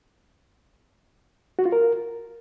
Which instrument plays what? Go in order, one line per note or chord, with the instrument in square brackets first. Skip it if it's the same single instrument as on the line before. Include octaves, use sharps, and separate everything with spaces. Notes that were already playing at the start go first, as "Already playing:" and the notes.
[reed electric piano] F#4
F4
A#4